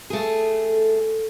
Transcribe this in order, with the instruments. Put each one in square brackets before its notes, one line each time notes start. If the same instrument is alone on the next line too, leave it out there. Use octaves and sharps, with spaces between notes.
[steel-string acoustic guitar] A3 G#4 [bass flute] A4